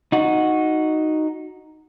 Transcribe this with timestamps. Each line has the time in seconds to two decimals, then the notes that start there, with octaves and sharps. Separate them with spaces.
0.12 D#4 F#4